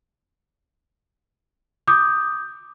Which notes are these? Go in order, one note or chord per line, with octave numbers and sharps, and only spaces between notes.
D6 D#6 G6